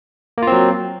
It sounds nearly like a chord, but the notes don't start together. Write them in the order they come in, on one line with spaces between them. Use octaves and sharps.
A#3 F4 C4 F#3